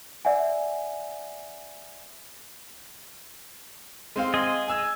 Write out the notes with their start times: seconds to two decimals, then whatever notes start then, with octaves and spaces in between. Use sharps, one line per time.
0.25 D5 E5 F#5 G#5
4.16 G#3 C4 F5
4.34 G#4 D#5
4.68 G#5 E6 G#6